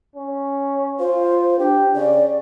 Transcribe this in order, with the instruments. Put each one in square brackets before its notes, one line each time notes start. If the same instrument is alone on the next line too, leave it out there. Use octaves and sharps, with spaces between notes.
[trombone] C#4
[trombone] F4 [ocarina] C5
[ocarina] D4 [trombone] G4
[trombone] C#3 [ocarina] D5